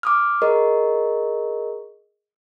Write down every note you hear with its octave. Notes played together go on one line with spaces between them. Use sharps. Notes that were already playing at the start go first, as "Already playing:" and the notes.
D6 D#6 F6
G#4 A#4 D#5 C#6